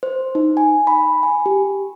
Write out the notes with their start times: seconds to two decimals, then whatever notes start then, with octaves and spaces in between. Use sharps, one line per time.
0.03 C5
0.35 D#4
0.57 G#5
0.87 B5
1.23 G#5
1.46 G4